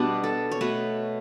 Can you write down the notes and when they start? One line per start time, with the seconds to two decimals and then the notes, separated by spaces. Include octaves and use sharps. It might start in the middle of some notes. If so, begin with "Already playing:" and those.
Already playing: B2 G3 B3 D4
0.24 A4
0.51 C#5
0.61 B2 A3 B4